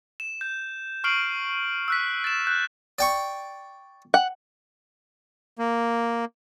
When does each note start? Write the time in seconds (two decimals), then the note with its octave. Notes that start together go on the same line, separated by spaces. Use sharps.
0.20 E7
0.41 G6
1.04 C#6 F6 C7 D7 F#7
1.88 E6 F#6 B6
2.24 A6 E7
2.47 F#6 G6
2.99 D5 G5 C#6
4.14 F#5
5.59 A#3